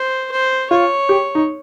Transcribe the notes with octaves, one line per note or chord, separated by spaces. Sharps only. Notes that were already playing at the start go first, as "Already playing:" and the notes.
Already playing: C5
C5
F4 C#5
G4
D#4